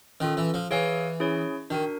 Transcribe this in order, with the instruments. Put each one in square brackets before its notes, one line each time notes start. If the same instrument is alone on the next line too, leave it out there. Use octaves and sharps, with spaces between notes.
[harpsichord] D#3 [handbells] C#4 F4 A4
[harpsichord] E3
F3
[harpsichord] E3 [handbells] G#4 C#5 F5 G#5
[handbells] C#4 E4 G#4 C#5
[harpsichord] D#3 [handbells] D4 F#4 A#4